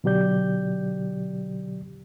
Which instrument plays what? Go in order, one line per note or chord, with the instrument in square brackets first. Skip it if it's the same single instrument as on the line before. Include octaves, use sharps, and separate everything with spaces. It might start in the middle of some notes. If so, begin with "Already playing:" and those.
[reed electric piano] B2 D3 F#3 G4 D5 G6